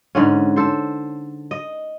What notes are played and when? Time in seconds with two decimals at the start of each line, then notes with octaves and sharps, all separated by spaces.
0.15 G#2 D3 C#4
0.56 A4 C5
1.51 D#5